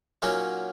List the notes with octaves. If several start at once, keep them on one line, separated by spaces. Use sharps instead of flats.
A#2 F#3 A#3 C#4 D#4 F#4